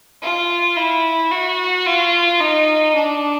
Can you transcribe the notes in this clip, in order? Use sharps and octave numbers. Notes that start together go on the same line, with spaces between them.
F4
E4
F#4
F4
D#4
D4